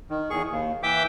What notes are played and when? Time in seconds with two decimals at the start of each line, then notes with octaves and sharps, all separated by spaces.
0.10 D#3
0.30 E2 G#4 C#6
0.50 D#2
0.83 E3 E5 G5 D6 G6